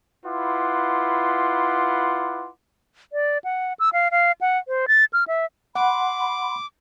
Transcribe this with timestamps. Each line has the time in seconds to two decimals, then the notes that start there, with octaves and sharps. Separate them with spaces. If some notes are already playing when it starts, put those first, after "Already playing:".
0.25 E4 F4 B4 F#5 C6 D6
3.13 D5
3.44 F#5
3.80 E6
3.93 F5
4.11 F5
4.41 F#5
4.68 C5
4.88 A6
5.13 F6
5.28 E5
5.75 F#5 B5 C6 D6